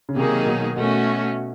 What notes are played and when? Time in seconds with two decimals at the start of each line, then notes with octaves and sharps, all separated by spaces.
0.09 C#3
0.16 C3 D#3 F#3 A#3 D#4 G#4
0.46 B2
0.76 B2 A3 C#4 F#4